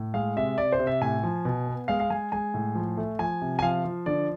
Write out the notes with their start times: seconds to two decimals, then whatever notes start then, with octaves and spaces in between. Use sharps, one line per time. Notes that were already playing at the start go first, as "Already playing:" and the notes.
Already playing: A2
0.14 G#3 F5
0.37 C3 E5
0.58 C3 D5
0.72 C5
0.79 C3
0.87 E5
1.01 A2 G#5
1.23 F3
1.45 B2
1.67 B3
1.88 G#3 F5
2.00 F5
2.10 G#3 G#5
2.32 G#3 G#5
2.54 A2
2.75 F3
2.97 A3
3.19 F3 G#5
3.41 C3
3.59 G#5
3.62 F3 F5
3.84 F3
4.06 D3 D5